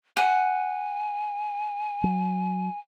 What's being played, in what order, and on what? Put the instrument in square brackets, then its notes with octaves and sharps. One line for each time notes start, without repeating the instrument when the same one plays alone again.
[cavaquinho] F#5 [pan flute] G#5
[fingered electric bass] F#3